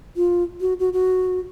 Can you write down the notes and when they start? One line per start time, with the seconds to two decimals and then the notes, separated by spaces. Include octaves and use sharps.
0.16 F4
0.61 F#4
0.80 F#4
0.93 F#4